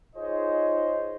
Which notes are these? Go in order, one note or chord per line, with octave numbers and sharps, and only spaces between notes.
D#4 F4 G#4 C5 C#5 D#5